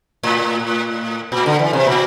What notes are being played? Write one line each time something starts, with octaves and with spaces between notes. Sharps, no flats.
A2
A#2
D3
E3
C3
A#2